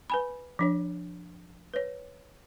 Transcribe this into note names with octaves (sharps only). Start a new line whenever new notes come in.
B4 G#5 B5
F3 D4 C#5
B4 C#5